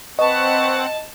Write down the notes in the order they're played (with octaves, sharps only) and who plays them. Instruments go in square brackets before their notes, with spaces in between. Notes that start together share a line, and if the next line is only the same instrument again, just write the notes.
[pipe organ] C4 F#5 [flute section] B4 C#6 [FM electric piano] D#5 [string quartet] A5